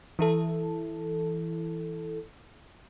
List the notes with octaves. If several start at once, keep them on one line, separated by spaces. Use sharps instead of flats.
E3 E4 A4